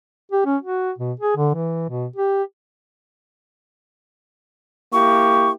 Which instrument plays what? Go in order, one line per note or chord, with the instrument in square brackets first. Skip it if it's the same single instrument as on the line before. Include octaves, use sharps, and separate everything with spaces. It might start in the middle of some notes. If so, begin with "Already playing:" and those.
[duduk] G4
C#4
F#4
B2
G#4
D3
E3
B2
G4
[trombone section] A#3 E4 G4 [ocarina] C#6